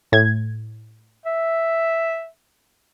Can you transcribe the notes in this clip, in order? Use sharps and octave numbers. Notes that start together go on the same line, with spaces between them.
A2 G#6
E5